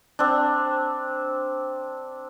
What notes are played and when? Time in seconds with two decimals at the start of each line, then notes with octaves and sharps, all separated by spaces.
0.19 C4 D4